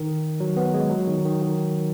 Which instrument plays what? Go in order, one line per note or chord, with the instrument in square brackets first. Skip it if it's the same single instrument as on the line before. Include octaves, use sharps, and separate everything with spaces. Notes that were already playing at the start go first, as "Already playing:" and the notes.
Already playing: [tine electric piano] D#3
F#3
B3
G#3
F#3
D#3
D#3
D#3